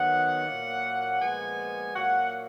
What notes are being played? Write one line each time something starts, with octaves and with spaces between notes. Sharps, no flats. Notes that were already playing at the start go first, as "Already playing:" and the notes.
Already playing: D#3 F#3 B3 F#5
A#2 F#3 A#3
A#2 F3 G#3 B3 G#5
A#2 F#3 A#3 F#5